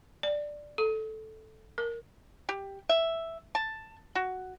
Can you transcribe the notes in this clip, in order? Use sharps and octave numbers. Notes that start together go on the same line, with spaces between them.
D5
A4
A#4
G4
E5
A5
F#4